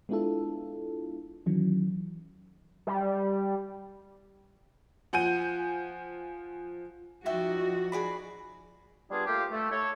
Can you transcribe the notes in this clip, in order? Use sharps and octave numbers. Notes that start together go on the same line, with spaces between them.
G#3 B3 D4 E4 F4 A4
D#3 E3 F#3 C#4
G3
F3 F#5 G#5 G6 D#7
F3 D#4 F#4 D5 E5 G5
G#4 D5 B5
G3 B3 D4 F4 G#4
A3 A#3 F4 G4
A3
E4 A4 C#5